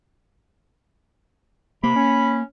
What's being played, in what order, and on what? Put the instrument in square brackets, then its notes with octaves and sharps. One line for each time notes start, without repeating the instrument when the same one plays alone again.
[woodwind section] C3 [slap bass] A#3 [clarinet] B5
[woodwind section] C#4